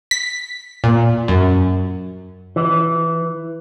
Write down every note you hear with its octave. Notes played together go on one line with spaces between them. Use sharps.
B6
A#2
F#2
E3